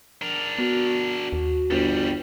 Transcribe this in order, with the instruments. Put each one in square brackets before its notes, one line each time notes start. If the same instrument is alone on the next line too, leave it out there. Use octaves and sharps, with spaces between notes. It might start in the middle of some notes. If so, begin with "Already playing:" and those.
[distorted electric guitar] D4 A#4
[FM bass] B3 [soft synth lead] F#4
[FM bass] D#2
[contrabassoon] G1 [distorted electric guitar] F2 G3